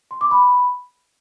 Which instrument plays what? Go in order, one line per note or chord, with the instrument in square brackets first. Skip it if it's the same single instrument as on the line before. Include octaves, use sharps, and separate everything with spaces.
[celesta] C6
D6
B5